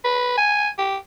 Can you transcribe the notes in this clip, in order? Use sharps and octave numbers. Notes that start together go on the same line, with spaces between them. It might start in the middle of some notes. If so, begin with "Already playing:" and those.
B4
G#5
G4